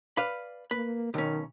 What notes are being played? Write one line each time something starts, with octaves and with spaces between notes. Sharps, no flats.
B4 D5 F5
A#3 B4
B1 D#3 C#4